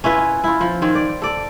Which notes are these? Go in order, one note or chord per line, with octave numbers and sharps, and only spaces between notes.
C#4 E4 F4 B4
E4 F4
F3
D#3 C4 C#5
D5
A4 D5